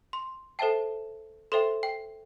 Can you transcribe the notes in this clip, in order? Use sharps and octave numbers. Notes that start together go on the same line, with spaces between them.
C6
A4 C5 E5 G5 A5
A4 C5 E5 G5 C6
G5